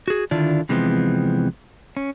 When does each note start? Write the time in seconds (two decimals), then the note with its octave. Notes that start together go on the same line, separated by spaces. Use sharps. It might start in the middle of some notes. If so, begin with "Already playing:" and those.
0.08 F#4 G#4
0.31 D3 D#3 D4 E4 F4 D5
0.69 C3 E3 F3 G#3 B3 C4
1.97 C#4